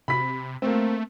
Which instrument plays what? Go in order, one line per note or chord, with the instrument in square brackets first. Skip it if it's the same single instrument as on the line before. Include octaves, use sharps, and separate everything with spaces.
[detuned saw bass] C3 [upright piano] B5 B6
[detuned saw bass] A3 [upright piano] A#3 C4